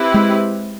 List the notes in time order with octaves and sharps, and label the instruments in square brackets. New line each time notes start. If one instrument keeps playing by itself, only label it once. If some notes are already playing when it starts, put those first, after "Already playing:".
Already playing: [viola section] C4 E4 G4 B4
[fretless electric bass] G#3